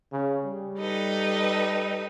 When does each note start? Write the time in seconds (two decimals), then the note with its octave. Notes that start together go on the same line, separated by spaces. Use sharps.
0.12 C#3
0.45 G3
0.78 D#4 A4 B4